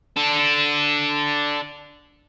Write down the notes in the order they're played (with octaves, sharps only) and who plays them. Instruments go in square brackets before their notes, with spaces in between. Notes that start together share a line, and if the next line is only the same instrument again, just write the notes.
[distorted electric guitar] D4 A4